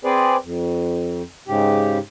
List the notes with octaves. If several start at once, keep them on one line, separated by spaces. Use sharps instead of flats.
C4 G#4 B4 C5 D5
F2
G#2 C#3 G4